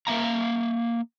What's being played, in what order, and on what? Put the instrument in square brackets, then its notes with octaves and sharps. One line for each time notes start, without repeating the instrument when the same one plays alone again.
[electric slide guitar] A#3 E5 F5 A#5